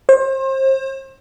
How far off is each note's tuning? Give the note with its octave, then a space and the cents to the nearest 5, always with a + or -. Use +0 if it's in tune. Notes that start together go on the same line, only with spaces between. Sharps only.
C5 +35